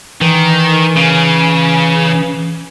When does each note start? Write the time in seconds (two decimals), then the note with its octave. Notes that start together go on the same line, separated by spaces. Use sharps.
0.21 D#3 E3
0.96 C#3